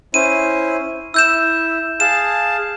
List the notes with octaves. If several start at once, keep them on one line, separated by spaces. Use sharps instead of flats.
C#4 E4 C5 D#7
E4 E6 G6 E7
G#4 F5 A5 E7